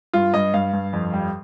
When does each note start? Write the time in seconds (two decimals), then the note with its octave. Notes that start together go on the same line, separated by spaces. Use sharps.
0.13 G2 F4
0.34 G2 D#5
0.54 G2 F5
0.73 G2
0.93 F2
1.13 G3